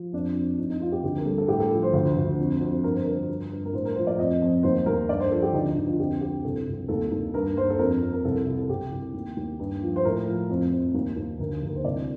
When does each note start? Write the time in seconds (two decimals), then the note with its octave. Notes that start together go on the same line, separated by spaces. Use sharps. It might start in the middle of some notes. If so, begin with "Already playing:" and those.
Already playing: F3
0.13 F2 D4
0.36 F2
0.58 F2 D#4
0.70 D#4
0.80 F2 F4
0.92 G4
1.03 D2 G4
1.17 A#4
1.25 G3 A4
1.38 A4
1.48 A2 G4
1.60 A4
1.71 F3
1.83 C5
1.93 D2
2.16 D2
2.39 F2
2.61 F2
2.83 G2 A#4
2.94 C5
3.03 G2 A#4
3.28 G2
3.52 G2
3.65 A#4
3.74 A2 C5
3.85 A#4
3.96 F3 C5
4.07 D5
4.18 F2 D#5
4.42 F2
4.63 D#2 C5
4.86 D#2 A#4
5.09 G2 D5
5.20 C5
5.31 F3 A4
5.42 G4
5.53 D2 D#4
5.65 D4
5.76 D2 D#4
5.88 F4
5.99 F2 G4
6.21 F2 G4
6.44 C2 A4
6.67 C2
6.88 D#2 A4
7.12 D#2
7.33 G2 A#4
7.56 G2 C5
7.70 A4
7.79 F2 A#4
8.02 F2
8.13 A#4
8.25 C2 A4
8.46 C2
8.58 A4
8.69 C2 G4
8.92 C2
9.14 D#2
9.37 D#2
9.59 G2
9.82 F3
9.96 C5
10.05 A2 A#4
10.27 F3
10.50 F2
10.71 F2
10.95 D#2
11.16 D#2
11.39 D2 A#4
11.63 D2 A#4
11.76 C5
11.85 C2 D5